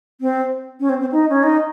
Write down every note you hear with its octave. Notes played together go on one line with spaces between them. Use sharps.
C4
C#4
C4
C4
D#4
C#4
D#4